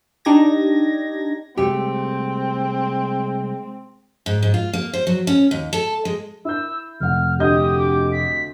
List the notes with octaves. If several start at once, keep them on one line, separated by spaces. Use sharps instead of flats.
D4 D#4 G4 G#6 A#6
C2 G#3 A3 C4 G4
G#2
G#2
F4
A#3
C5
F#3
C#4
D#2
A4
G#3
E4 E6 G6
F1 F#5 F6
D2 G4 D#5 D#6 G6
D6
B6